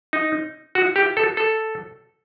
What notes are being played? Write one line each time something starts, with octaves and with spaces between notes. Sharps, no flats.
D#4
F#4
G4
A4
A4